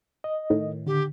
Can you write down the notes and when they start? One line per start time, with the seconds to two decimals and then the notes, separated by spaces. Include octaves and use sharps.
0.24 D#5
0.50 A2 D#3
0.87 D3 G4